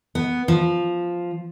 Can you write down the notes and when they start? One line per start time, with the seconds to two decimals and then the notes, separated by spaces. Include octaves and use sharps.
0.15 B3
0.48 F3